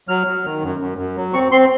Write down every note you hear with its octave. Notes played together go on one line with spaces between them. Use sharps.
F#3 F6
F#3
D#3
F#2
F#2
F#2
F#3
C4 C#6
C4 C6